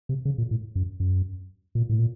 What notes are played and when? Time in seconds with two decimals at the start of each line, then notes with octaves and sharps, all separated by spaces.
0.09 C3
0.25 C#3
0.38 A#2
0.51 A2
0.75 F#2
1.00 F#2
1.75 A#2
1.89 A2
1.99 A#2